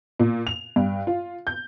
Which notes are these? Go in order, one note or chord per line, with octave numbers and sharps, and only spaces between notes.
A#2
F7
G2
F4
G6